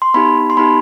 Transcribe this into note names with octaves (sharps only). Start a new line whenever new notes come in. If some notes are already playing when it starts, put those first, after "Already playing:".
C6
B3 D#4 G4 B5
C6
B3 D#4 G4 B5